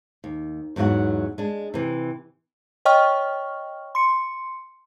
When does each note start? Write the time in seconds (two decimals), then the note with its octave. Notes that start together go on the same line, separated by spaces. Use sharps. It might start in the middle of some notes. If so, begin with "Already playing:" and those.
0.24 D#2
0.76 E2 G#2 F#3 F#4 F#5
1.38 G#3 D4
1.74 C3 E3
2.85 C#5 D#5 G5 C#6 F6
3.95 C6 C#7